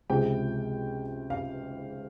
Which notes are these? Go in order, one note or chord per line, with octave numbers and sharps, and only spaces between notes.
C#2 C3 F3 G#3 C4 G5
F5